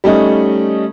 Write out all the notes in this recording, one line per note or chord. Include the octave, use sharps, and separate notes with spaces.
G3 A3 C#4 D#4